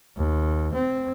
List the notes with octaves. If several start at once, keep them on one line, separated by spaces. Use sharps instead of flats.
D#2
C4